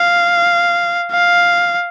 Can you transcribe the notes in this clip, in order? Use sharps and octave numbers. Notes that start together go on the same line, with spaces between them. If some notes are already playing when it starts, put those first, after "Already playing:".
Already playing: F5
F5